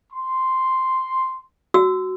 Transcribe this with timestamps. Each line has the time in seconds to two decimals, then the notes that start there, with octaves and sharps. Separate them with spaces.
0.12 C6
1.74 F#4 E6